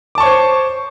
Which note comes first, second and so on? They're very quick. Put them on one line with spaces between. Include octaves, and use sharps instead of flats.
D6 A5 C#6 C#5 C5